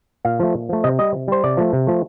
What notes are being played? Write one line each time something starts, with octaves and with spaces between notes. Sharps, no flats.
A#2 F5
F3 A3
A#2
F3 A3
C3 D#5
G3 D#5
C3
G3 C5
C3 D5
F3 A3
C3
F3 A3